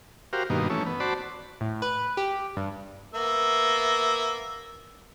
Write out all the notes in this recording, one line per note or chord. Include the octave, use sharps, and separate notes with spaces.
F#4 G4 A#4 C5 F5
G2 B2 D#3 A#3
E3 A3 C#4
B3
F#4 C5 D5 A5 B5
A2
B4
G4
G2
A#3 B3 E5